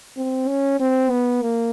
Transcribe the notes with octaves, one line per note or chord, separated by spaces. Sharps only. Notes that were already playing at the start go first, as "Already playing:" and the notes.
C4
C#4
C4
B3
A#3